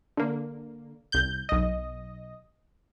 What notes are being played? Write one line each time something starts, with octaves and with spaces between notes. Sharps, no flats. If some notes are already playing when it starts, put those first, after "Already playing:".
D3 A#3
C2 G6
B1 D#5